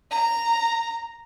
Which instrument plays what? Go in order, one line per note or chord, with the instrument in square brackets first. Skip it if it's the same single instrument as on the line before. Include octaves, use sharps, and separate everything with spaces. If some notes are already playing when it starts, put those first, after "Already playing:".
[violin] A#5